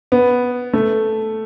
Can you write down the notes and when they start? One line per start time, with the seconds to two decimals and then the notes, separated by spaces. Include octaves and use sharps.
0.12 B3
0.73 A3